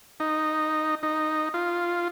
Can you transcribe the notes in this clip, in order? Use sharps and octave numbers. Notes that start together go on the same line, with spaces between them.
D#4
D#4
F4